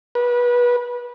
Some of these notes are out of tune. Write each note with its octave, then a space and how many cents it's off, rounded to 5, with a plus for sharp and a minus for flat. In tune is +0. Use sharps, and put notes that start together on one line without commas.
B4 -25